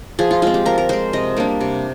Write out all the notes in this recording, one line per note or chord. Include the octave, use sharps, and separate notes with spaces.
F3 G#4
F4
G#3 C4 F4
G4
F3 A#4
A#4
G#3 C4 C5
C3 D#5
G3 A#3 D4
C3